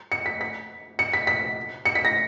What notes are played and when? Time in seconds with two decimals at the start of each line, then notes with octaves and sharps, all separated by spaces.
0.12 C#7
0.26 B6
0.41 B6
0.99 C#7
1.13 B6
1.27 B6
1.85 C#7
1.95 B6
2.05 A#6